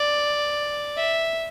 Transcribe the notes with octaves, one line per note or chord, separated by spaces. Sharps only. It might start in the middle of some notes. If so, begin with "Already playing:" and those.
Already playing: D5
E5